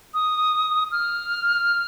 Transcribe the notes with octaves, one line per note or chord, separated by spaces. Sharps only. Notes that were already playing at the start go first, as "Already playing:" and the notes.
D#6
F6